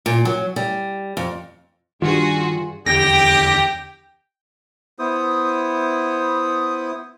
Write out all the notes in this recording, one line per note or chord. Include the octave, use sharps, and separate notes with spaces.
A#2
F#3
G3
F2
G2 D#3 F4 F#4 G#4
E2 D3 G4 G5 A#6
B3 E4 C5 D#6